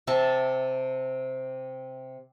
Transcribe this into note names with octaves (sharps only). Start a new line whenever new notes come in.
C3 E5 A5